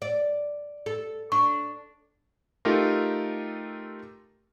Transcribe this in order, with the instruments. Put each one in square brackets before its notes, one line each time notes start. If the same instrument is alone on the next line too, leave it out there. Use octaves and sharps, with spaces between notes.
[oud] D5
A4
[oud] D4 [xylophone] C#6
[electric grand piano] A3 D#4 F4 G4 A4 A#4